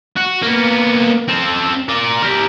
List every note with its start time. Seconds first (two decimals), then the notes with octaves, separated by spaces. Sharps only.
0.16 F#4
0.42 A#3 B3
1.28 C4 A4
1.88 A#4 D5
2.23 G4 A#4